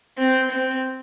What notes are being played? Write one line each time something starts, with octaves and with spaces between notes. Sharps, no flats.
C4
C4